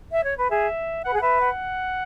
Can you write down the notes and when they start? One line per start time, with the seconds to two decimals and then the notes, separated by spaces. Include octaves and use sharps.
0.11 E5
0.23 C#5
0.37 B4
0.50 G#4 E5
1.04 B4 F#5
1.13 G#4
1.18 F#5
1.21 B4 E5
1.41 F#5